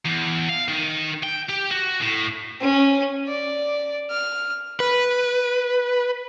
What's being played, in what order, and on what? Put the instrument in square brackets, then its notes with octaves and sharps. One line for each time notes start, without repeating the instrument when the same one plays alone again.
[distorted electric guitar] E2
F5
D#3
G5
G4
F#4
A2
[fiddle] C#4
D5
F6
[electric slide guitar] B4